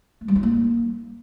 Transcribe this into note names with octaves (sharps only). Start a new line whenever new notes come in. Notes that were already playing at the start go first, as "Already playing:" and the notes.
A3
G3
D#4
A#3